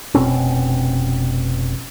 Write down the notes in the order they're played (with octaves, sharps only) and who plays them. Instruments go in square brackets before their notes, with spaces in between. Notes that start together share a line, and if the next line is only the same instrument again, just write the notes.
[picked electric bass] F1 B2 C4 C#4